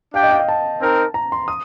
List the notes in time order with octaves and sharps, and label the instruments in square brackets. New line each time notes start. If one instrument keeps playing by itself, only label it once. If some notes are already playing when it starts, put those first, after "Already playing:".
[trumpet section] D4 G4 D5 G5 [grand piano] F5
[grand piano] D#5
F5
G5
A5
[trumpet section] C4 D#4 A#4
[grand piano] A#5
C6
D#6